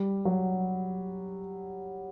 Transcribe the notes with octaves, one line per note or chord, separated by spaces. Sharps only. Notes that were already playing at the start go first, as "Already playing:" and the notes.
Already playing: G3
F#3